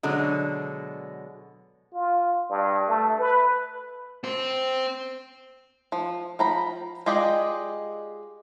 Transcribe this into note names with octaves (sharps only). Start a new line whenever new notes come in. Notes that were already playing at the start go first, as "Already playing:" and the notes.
B2 D3 F#3 G#3
F4
G2
A3
B4
C4 C5
F3
F3 A#5 B5
G#3 F4 G4 D5 D#5